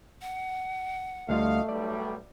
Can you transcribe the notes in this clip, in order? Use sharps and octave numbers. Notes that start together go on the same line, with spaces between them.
F#5
D2 G3 A3 F4 D#5 F5
B1 G3 D5